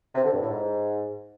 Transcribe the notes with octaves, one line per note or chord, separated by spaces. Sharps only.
C3
D3
G2
A2
G#2